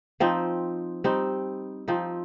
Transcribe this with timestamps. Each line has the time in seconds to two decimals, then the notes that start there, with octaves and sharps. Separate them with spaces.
0.20 F3 C4 D#4
1.04 G3 C4 D#4
1.88 F3 C4 D#4